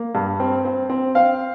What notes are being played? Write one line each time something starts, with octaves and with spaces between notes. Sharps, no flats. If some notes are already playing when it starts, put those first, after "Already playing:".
Already playing: A#3
G2
C4
C4
C4
C4 F5